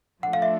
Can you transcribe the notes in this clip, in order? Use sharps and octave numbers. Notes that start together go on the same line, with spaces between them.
F3 A3 D4 F4 A4 F#5
F5
E5